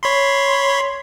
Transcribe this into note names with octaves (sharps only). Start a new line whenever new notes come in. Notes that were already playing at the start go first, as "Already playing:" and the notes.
C#5 B5 C6